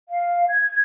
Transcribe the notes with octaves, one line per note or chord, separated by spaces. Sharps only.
F5
G#6